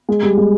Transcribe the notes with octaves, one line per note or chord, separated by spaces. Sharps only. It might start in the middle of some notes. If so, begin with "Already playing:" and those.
G#3
G3
G#3